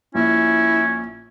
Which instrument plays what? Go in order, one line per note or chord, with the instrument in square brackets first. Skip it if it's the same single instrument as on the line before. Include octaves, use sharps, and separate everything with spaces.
[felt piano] A#1 [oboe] C#4 [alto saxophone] E4